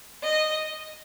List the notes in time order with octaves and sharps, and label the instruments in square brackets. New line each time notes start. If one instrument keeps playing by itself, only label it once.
[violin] D#5